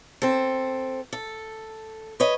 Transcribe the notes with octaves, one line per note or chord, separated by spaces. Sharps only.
C4 A4
A4
B4 C#5 D#5